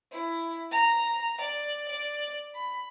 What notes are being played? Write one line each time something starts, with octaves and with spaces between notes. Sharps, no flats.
E4
A#5
D5
D5
B5